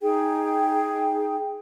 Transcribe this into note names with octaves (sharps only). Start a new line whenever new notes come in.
D#4 G#4 G5